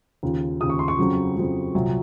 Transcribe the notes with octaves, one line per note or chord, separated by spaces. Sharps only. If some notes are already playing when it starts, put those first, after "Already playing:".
D#2 C#3 F3
D#2 C#3 F3 D#6
C#6
C6
C#6
F2 C#3 F#3
F2 C#3 F#3
C2 A#2 F#3